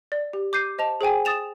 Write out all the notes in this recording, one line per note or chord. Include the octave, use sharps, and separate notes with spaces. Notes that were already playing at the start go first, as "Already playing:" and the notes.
D5
G4
D6 G6 C7 D#7
C5 D#5 A5 F7
G#4 C5 G5 G#5
D#6 A6 E7 F7